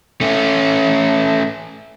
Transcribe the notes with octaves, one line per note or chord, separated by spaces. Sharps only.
A3 C#4